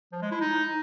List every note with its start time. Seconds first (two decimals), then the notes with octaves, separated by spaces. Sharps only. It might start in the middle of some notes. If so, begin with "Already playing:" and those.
0.12 F3
0.22 G#3
0.32 E4
0.41 D#4